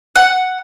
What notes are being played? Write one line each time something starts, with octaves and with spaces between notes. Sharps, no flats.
F#5